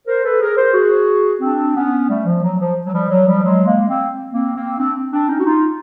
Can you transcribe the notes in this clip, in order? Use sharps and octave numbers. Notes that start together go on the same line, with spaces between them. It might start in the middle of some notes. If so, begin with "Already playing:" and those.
A#4 C5
A4 B4
G#4 A#4
A#4 C5
F#4 G#4
C4 D4
B3 C#4
G3 A3
F3
F#3
F3
F#3
F3 G3
F#3
F3 G3
F#3 G#3
G#3 A#3
A#3 C4
A#3 C4
A#3 C4
C4 D4
C4 D4
C#4 D#4
F#4
D#4 F4